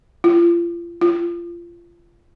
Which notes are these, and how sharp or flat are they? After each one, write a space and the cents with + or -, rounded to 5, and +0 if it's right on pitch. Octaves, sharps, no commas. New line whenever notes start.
F4 -35
F4 -25